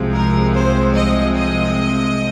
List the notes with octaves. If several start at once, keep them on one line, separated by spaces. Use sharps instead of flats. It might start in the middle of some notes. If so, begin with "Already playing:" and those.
Already playing: C2 C3 F3 G#3 C4
A#4
C5
D#5
D#5